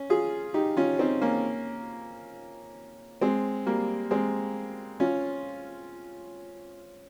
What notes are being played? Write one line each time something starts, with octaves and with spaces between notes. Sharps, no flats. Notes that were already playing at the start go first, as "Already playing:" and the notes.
Already playing: C#4
F4 G#4
D#4 G4
C#4 F4
C4 D#4
A#3 C#4
G#3 C4
G3 A#3
G#3 C4
C#4 F4